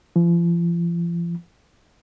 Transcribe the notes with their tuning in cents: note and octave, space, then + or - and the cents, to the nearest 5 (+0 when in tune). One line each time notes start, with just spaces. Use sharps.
F3 -40